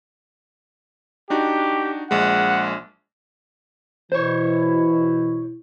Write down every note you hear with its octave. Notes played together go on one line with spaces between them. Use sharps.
D4 D#4 F#4 G4
A#1 G#3 F#5
B2 E3 E4 C5 C#5